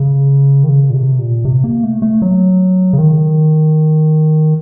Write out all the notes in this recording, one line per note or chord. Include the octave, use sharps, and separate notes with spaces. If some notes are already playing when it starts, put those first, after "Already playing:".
Already playing: C#3
D#3
C#3
A#2
C3
A#2
C3
A#3
A3
A3
F#3
C#3
D#3